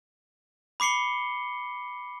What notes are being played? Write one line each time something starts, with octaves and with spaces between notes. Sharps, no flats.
B5 D6 C7 C#7 G7